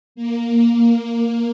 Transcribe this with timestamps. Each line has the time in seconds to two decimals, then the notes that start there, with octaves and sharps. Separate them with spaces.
0.15 A#3